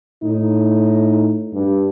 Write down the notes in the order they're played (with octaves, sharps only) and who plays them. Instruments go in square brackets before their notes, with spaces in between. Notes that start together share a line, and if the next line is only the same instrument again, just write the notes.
[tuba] A2 [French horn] D#4
[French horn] G2